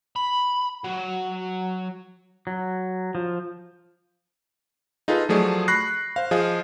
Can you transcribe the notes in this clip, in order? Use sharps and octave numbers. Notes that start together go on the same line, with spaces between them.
B5
F#3
F#3
F3
D#4 F4 G#4 A4 B4 A5
F3 F#3 A3 G#4 D5
B5 C#6 F#6 A#6 C7
C5 F5
F3 G#4 D#5 F5